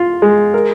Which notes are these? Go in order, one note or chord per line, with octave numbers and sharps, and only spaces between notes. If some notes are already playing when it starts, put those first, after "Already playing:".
Already playing: F4
G#3
A#4